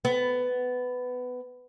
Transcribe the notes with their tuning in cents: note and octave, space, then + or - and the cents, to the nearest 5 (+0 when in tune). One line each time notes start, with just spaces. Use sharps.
B3 +15